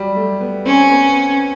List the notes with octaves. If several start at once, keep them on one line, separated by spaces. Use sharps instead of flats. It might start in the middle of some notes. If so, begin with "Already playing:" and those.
Already playing: F#3 G3
A3
B3
C4 C#4
B3